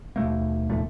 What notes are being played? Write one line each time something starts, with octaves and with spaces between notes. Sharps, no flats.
D#2 B2 A3 A#3
F1 D#2 A#2 A3